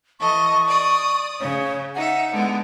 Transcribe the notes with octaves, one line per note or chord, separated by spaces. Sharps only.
E3 A4 D#5 C#6
D5 D#6
C#3 C#5
D#4 E5 F#5
D3 G#3 B3